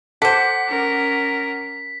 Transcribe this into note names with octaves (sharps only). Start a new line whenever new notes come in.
A4 C5 F#5 D6 B6
C#4 A#4